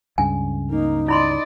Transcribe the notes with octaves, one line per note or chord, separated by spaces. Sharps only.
C#2 G2 C#3 G#5
A#3 D#4
E4 D5 D#5 B5 C6